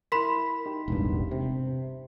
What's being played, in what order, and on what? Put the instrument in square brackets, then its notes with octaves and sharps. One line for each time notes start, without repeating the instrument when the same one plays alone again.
[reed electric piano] E4 A#4 [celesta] B5 C6 B6
[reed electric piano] D#4 G4
[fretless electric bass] E1 A1 G2
C3